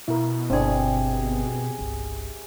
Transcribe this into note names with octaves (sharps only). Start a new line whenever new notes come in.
B2 E4 A#4
G1 C3 C4 D4 G#4
G1 C2